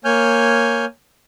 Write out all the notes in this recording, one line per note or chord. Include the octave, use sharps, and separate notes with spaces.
A#3 C#5 G#5 F6 G6